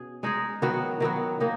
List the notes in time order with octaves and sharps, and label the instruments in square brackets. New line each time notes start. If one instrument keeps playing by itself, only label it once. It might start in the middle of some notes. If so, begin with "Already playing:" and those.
Already playing: [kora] B2 C#4 F#4 G#4
G#3 D#4 G#4
D#3 F#3 B3 F#4
D#3 F#3 B3 F#4
D#3 A#3 D#4